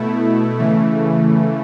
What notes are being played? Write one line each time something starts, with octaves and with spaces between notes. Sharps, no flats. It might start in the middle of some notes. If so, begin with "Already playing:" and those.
Already playing: B2 A3 E4
C#3 E3 A3